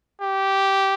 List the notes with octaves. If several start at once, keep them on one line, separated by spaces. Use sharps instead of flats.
G4